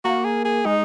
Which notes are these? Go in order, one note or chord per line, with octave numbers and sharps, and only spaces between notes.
A#3 F#4
G#4
G#4
G#3 D#4